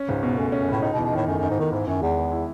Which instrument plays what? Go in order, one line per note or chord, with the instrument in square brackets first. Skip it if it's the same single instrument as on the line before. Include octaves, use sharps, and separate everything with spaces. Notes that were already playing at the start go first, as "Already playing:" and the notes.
Already playing: [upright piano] C#4
[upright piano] C#2 [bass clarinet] G#2
[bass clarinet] G#2 [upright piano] B2
[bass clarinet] F#2 [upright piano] A3
[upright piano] C#4
[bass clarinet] F#2
[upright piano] C#2 [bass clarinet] A2
[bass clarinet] A2 [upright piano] D#4
[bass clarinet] B2
[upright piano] E2
[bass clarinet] B2
[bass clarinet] A2 [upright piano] D#3
[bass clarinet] F#2 [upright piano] A3
[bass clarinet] F#2
[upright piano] D#4
[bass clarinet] G#2
[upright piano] E2 [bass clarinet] D#3
[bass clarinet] G#2 [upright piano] E4
[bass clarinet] F#2 [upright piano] D#3
[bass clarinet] E2 [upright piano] G#3
[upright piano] B3
E4